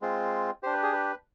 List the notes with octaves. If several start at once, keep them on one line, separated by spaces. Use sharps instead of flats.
G#3 C4 F4
D4 G4 C5
B4
G#4
B4